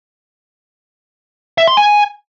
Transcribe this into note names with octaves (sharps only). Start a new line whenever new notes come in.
E5
C6
G#5